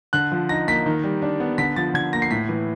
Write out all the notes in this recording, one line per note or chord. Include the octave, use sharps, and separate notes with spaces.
D3 F#6
F3
D#4 A#6
A#3 B6
D#3
G3
D4
B3
D3 B6
F3 A6
D3 G#6
A#3 A#6
C7
A2 B6
E3